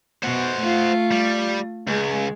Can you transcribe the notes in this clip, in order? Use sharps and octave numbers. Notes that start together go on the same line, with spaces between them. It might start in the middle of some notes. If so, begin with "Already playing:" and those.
B2 C5 F#5
A3 F4
G3
C#2 G#3